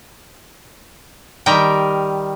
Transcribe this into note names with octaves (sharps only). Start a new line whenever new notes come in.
D#3 G3 A#4 G5